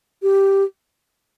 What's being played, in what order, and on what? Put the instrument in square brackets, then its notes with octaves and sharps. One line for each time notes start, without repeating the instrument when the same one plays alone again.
[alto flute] G4